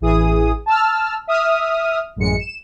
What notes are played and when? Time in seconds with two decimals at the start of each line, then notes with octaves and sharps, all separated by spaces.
0.01 A1 E3 G#4 D#6
0.66 A5 E6 F6
1.27 E5 D#6 F6
2.16 A1 F#2 G#3 C#7
2.39 E7